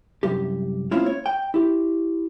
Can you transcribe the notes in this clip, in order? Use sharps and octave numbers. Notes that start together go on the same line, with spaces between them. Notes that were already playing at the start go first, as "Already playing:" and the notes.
C2 F#2 G4
A#3 C4 C#4 E4 F4
C#5
G5
E4 G4